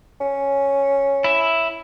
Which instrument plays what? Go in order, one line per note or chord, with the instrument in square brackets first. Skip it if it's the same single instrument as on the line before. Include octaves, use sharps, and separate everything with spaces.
[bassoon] C#4
[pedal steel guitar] E4 E5